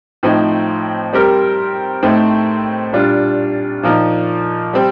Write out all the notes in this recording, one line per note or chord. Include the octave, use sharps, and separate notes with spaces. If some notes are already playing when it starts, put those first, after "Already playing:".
A2 F3 C4 D#4
G3 C4 G4 A#4
A2 A3 C4 D#4
A#2 G3 D4 F4
A#2 F3 A#3 D#4
G3 C4